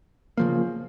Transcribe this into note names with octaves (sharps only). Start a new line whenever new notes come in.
C#3 F3 A#3